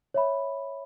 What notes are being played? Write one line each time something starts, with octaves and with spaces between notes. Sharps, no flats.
C#5 E5 B5